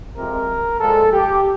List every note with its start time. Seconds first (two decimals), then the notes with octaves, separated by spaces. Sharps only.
0.17 F2 C3 F3 G#3 A#4
0.80 A#2 F3 G#3 A4
1.12 G4